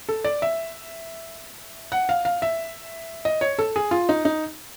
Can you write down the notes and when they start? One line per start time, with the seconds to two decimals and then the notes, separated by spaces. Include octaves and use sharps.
0.09 A4
0.24 D5
0.42 E5
1.92 F#5
2.09 F5
2.25 F5
2.42 E5
3.25 D#5
3.41 C#5
3.59 A4
3.76 G#4
3.91 F4
4.09 D#4
4.25 D#4